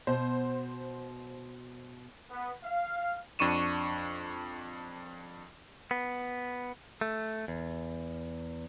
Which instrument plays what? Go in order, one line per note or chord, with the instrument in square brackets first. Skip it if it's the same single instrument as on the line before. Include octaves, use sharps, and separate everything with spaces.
[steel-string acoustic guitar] B2 [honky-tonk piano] C5
[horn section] B3
F5
[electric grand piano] F2 D4 C#6 D#7 E7
[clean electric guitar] B3
A3
E2